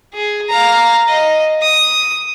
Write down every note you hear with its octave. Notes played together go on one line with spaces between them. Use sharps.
G#4
F5 A#5
D#5
D#6